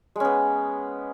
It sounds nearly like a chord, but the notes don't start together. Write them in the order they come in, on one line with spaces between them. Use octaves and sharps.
G#3 C#4 B3